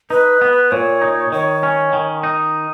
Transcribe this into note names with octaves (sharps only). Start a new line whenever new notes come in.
D#4 B4
B3
A#2 C#5
D#4
D#3 C#5
C#4
D#3
D#4